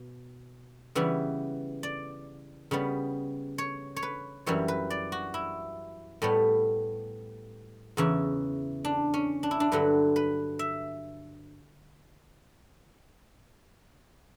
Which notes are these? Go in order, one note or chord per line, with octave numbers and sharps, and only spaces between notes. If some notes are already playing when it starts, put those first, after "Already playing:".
Already playing: B2
C#3 E3 G3 B3
D5
C#3 G3 B3
C#5
C#5
B4
F#2 E3 G3 C#5
B4
D5
F#4
E4
A2 G3 B3
E2 C#3 E3
D4
C#4
D4
E4
D4
G2 D3 F#3 B4
B4
E5